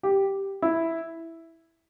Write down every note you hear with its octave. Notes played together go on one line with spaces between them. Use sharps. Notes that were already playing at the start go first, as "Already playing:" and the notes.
G4
E4